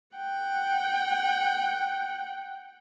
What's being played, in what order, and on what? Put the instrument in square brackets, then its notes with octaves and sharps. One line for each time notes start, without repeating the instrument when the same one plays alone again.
[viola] F#5 G5